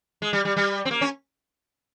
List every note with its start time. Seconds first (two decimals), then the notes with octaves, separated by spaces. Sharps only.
0.22 G#3
0.33 G3
0.45 G3
0.57 G3
0.85 C4
0.91 A#3
1.01 C#4